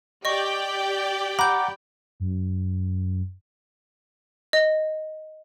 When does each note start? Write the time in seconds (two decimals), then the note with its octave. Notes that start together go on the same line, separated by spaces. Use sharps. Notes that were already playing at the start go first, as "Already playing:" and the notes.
0.25 G4 D5 D#5 G5 C#6
1.39 F#5 A#5 B5 D6 G6
2.20 F#2
4.53 D#5